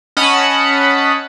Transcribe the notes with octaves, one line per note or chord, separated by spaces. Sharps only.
C#4 D#5 F#5 A5 B5 C#7